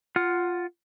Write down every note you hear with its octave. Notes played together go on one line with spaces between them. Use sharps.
F4 F#5 F6